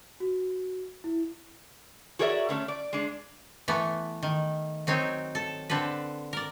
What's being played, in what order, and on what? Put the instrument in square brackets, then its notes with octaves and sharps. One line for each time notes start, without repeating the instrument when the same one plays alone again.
[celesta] F#4
E4
[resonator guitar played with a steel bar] F#4 G#4 A#4 C#5 D5 E5
D3 A3 C#4
D5
G#3 D4
[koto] E3 A3 B3
D#3
F#3 C4 D#4 C#5
A4
D3 C4 A4 B4
A#4 D5